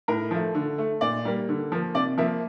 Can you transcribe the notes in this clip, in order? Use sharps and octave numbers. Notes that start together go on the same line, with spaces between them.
A2 A#4
F3 A3
D3
A3
A#2 D5
G3 A#3
D3
F3 A#3
C3 D5
F3 A#3 E5